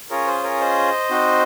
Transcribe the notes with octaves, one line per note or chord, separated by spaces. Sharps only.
C#4 F4 G#4 A#4 C#5
C5
A#4 C#5
C5 D#5
C4 D#4 F#4